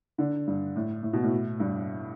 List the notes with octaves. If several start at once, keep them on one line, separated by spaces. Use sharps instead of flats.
D3
G2
A2
A2
B2
A2
G2